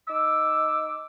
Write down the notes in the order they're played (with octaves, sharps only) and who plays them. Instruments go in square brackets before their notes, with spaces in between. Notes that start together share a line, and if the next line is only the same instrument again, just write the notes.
[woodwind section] D#4 D6 E6